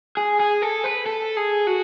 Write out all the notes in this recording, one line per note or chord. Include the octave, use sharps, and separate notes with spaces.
G#4
G#4
A4
B4
A4
G#4
F#4